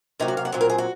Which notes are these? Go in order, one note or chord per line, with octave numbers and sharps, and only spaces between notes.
C3 F#3 A#3 D#4
F#4
F5
F#5
A#2 F#3 C4
A#4
G#4
F#4